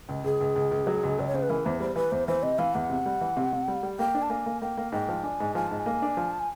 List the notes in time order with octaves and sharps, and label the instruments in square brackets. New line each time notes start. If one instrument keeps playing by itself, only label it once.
[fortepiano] C#2
[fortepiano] C#2 [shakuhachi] G#4
[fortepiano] C#2
C#2
C#2
F#3
C#2
[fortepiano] C#2 [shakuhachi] D5
[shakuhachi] C#5
[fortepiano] C#3 [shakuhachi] C5
[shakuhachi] B4
[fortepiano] E3 [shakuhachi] A#4
[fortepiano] E2 [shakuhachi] C5
[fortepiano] G3 [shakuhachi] C5
[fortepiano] E3 [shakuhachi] B4
[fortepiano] E2 [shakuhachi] C5
[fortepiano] E3 [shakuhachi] C5
[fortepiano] C3 [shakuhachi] D#5
[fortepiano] E3 [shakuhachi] F5
[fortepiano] E2 [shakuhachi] F#5
[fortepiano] C3
G3
E3
C3
C3
G3
G3
[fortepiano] A#3 [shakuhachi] G5
[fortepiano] D4
[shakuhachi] A5
[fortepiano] A#3 [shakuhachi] G#5
[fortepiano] A#3
[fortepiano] A#3 [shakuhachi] G5
[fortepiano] A#3
[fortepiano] G#2 [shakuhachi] G5
[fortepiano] F3
[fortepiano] D4 [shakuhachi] G#5
[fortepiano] G#2
[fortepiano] F3 [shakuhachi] G#5
[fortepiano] G#2 [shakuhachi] A5
[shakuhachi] G#5
[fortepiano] A#3
D4
F3
[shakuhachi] A5
G#5